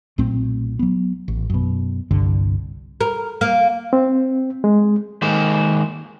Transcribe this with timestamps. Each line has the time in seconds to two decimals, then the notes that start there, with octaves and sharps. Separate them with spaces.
0.18 B1 A#2 A3 C4
0.79 F#3 B3
1.28 A1
1.50 F#2 B2
2.11 G1 C2 G2 D3
3.01 A#4
3.41 A#3
3.93 C4
4.64 G#3
5.22 D#3 G#3 A#3 C5